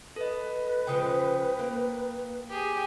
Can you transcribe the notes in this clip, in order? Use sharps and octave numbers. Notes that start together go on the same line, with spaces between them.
A4 B4 D#5
C#3 F3 G#3 G5 D#6
A#3
G4 G#4